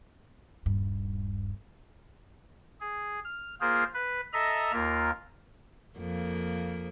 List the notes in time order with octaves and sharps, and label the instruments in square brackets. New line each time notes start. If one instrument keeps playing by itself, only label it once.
[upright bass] D#1 G2
[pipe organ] G#4
F6
A#3 F4 G#4 A#4 C5
B4
A4 D#5 E5 A#5
D#2 A#3 F4 A#4 F6
[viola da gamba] F2 A#3